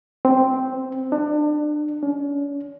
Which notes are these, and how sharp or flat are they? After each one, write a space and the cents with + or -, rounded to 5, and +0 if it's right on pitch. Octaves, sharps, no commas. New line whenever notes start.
C4 -5
D4 +30
C#4 +40